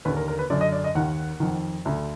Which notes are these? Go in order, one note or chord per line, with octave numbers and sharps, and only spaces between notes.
D#2 D3 B4
A#4
A#4
B4
F#2 D3 D5
D#5
D5
D#5
D#2 D#3 F#5
F2 D#3
D2 D3